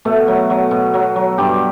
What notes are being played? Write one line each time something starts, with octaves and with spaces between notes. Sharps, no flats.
B2 A3
F#3
F#3
B2
F#3
F#3
G2 G4